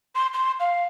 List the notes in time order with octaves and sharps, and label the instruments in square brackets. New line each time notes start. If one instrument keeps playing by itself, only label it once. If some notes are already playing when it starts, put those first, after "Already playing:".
[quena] C6
C6
F5